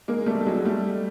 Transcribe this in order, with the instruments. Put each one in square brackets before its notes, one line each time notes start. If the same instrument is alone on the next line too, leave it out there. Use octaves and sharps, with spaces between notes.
[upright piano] G#3 A#3
G3 A3
A3
F#3 G#3
G#3
G3 A3